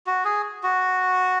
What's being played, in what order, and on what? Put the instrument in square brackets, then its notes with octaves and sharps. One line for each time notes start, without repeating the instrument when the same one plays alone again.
[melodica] F#4
G#4
F#4